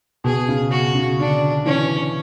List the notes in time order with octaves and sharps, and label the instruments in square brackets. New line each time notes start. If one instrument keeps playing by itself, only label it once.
[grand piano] B2 [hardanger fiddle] G#4
[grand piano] C#3
[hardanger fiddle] F#4
[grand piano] C#3
[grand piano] D3 [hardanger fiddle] D4
[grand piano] E3 [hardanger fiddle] C#4